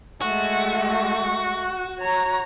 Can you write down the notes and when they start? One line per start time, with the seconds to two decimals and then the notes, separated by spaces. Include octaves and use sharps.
0.21 G#3 A3 F#4
2.00 C#5 A#5